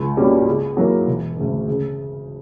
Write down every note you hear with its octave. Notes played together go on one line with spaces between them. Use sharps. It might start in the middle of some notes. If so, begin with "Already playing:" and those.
Already playing: C#2
B2 G3 A#3 C#4
C#3
F#3 A#3 E4 A#4
E1
D2 C#3
C#3